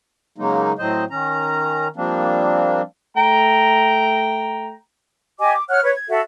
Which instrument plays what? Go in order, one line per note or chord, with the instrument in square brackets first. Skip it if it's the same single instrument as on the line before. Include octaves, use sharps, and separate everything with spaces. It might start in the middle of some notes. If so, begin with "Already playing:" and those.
[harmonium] C#3 F#3 G#3 A#3 D#4
A2 F#3 C4 C5 D#5
D#3 C#4 A#5
F3 G3 A#3 C4 D4
[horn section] A3 G5 A#5
[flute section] G4 D#5 G#5 D6
D6
C#5 F#5 F6 F#6
B4 C#5 G#6
G#6
F#4 A4 E5